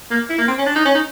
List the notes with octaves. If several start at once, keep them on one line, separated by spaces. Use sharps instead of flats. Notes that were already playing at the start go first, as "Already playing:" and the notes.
A#3
E4
A#3
C4
C#4
D4
D#4
C#4
D#4